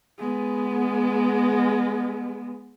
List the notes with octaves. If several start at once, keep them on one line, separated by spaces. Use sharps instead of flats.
G#3 B3